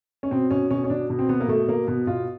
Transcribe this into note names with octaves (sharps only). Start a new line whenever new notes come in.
C#4
B2 C4
B2 C#4
B2 C#4
C#4
B2 D4
B2
C4
B2 B3
A#3
B2 A3
B2 A#3
B2 B3
B2 F4